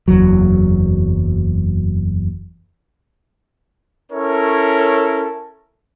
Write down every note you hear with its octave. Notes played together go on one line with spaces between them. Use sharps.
F#1 E2 F#3
C#4 E4 A4 A#4 C#5